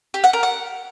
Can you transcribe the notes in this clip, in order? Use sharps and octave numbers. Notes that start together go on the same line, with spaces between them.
G4
F#5
A#4
F#5